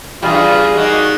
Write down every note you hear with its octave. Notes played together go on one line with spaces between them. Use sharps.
E2 G2 G3 F4 G#4
D#3 A#3 F#4